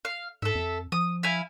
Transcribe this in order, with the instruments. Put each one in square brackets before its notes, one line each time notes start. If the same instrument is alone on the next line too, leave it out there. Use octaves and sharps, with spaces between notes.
[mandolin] F5
[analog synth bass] G#2 [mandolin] A4 E5
[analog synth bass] F2
[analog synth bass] F3 [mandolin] D#6
[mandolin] E4 F5 G#5